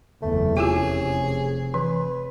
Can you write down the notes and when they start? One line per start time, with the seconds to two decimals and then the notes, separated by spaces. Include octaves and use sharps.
0.22 F#1 E2 A3
0.57 F1 C#4 E4 F4 G4 G#4
1.74 E3 B4